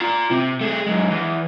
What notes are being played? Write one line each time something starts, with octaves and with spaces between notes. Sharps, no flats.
F4 A#5
C3
A3 G#4
F#2 G#3
E2